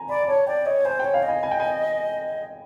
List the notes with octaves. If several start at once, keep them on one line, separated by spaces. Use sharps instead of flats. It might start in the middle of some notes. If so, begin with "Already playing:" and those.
Already playing: G#5 A#5
D5 B5
G#5
C#5 A5
D5 G5
C#5 D#5
C5 G#5
G5
C#5
F5
D#5
G#5
G#5
G5
G#5